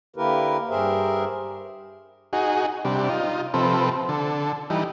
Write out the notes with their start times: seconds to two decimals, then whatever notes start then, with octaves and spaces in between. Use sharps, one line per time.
0.16 D3 A#3 E4 G4 A#4 B4
0.69 G2 G4 G#4 A#4 C5 E5
2.33 D#4 F#4 G#4
2.85 C3 G3 D4
3.09 D#4 F4
3.54 C3 F3 C4 A4 B4
4.09 D3 A4
4.70 E3 G3 D#4